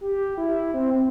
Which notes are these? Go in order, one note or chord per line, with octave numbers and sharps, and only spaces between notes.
G4
E4
C4
C4